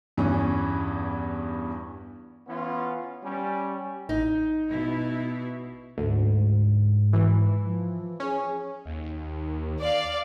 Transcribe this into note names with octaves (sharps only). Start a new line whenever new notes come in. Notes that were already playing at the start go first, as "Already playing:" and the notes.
E2 G2 E3 C#4
E3 B3 C#4 F4
G3 C#4
A1 D#4
B2 E4
D2 G#2
E3
F3
C#4 G#4
D#2
D5 F5